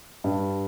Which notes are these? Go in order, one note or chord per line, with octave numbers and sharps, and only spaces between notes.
G2